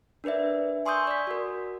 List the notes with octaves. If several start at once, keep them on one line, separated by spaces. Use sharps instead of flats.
D4 A#4 B4 D5 E5
G#5 C6 C#6 D#6 E6 G6
D5 B6
F#4 A#4